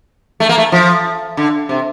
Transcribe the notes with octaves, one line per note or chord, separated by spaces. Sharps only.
A3
A#3
A3
F3
D3
C3